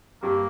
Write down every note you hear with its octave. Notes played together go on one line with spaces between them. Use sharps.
G2 A#3